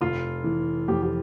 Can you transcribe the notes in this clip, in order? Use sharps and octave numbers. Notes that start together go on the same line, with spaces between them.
F1 F4
E3
F2 G4
G4